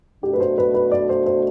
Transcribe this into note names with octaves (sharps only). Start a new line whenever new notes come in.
B2 A3 D4 F#4 G4
B4
C5
B4
B4
D5
C5
C5